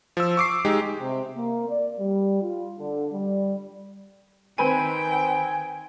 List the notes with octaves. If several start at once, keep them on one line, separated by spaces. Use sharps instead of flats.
F3 E6
C#6 D6 C7
G#3 D#4 G4
C3
A#3
D5
G3
F4
D3
G3
D#3 C4 B4 G5 G#5 D#7